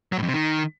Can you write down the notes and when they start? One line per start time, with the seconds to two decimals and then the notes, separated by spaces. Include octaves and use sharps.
0.12 F#3
0.18 A2
0.23 F2
0.28 C3
0.33 D#3